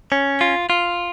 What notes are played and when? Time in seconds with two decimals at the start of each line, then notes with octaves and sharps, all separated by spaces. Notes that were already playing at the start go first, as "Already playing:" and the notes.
0.12 C#4
0.41 F4
0.70 F4